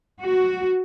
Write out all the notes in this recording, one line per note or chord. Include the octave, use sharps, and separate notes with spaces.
F#4